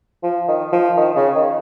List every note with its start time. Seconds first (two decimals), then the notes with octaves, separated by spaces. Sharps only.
0.23 F3
0.48 D#3
0.73 F3
0.97 D#3
1.16 C#3
1.35 D#3